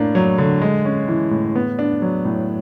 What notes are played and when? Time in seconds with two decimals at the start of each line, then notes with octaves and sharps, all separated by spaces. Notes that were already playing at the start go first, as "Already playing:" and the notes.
Already playing: A2 A#3 D4
0.15 F#3
0.38 D3
0.61 G#3
0.85 C#4
1.08 E3
1.31 A2
1.55 B3
1.79 D4
2.02 F#3
2.25 A2